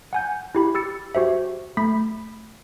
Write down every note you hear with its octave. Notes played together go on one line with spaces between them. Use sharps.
F#5 G#5 G6
E4 G4 B5
G4 E6 A6 C#7
F#4 G4 C5 E5
A3 B5 B6